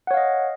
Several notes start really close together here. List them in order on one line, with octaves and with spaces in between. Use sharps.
F#5 C#5 F5 D#5